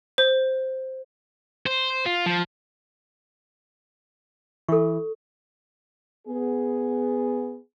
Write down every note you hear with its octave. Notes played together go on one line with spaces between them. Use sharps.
C5
C5
F4
F3
E3 A4 C#6
B3 G#4